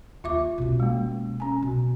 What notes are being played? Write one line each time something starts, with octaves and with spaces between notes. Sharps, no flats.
D#2 F4 E5 D6
B2 C#4
G#3 A#3
C#4 G#5
B2